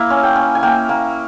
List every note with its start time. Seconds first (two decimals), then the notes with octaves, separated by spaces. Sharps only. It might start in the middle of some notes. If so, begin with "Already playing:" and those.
Already playing: A#3 E4 E5
0.10 C#4
0.23 G5
0.36 C#4
0.55 G#5
0.63 A#3 G5
0.89 A#3